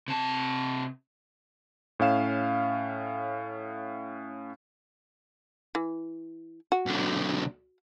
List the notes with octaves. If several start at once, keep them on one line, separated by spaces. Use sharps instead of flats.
C3 A5
A2 C#4 F5 E7
E3
F#4
B1 D3